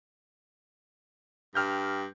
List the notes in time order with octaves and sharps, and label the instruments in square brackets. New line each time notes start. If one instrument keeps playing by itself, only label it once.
[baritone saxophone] G2 [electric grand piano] G5 F6 G6